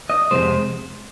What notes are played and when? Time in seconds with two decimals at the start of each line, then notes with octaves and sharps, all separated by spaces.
0.10 D#5
0.31 F2 C3 F3 G#3 C5